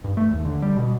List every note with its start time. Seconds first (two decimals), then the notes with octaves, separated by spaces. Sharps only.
0.04 G2
0.17 A3
0.31 D#2
0.45 D3
0.62 G3
0.77 B2